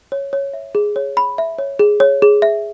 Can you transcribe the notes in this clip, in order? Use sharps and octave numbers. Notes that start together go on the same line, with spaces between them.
C#5
C#5
E5
G#4
C#5
B5
E5
C#5
G#4
C#5
G#4
E5